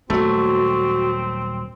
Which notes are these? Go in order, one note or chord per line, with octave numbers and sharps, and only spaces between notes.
D#1 F#3 A3 C4 F#4